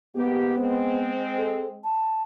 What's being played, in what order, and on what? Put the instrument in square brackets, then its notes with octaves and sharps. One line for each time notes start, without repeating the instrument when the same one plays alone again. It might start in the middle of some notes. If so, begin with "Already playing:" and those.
[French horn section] G#2 A#3 G4 [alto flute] B3
[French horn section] G#3 C4
[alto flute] A4
A5